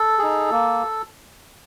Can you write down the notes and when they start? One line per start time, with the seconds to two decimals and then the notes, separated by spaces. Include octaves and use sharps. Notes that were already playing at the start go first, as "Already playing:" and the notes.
Already playing: A4
0.19 D#4 G#4
0.51 A#3